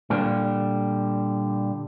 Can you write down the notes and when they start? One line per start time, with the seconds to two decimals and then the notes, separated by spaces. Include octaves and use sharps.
0.10 A#2 D3 G3